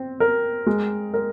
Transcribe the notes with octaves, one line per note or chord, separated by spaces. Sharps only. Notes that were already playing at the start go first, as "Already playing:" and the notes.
Already playing: C4
A#4
G#3
A#4